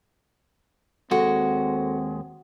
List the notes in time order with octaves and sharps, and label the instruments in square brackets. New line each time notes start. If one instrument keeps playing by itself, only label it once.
[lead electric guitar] D#2 G#3 [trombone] C4 [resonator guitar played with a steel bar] F#4 [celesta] A4